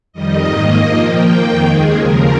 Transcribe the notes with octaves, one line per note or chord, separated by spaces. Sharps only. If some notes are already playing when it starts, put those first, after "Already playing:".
F2 D#3 G3 D#5
G#2 D#3 A#3
G2 F3 A#3 D#5
A#2 F3 A#3 G5
F2 D#3 A#3 G5
D#2 D#3 G#3 G#4
D#2 C#3 F3 A#4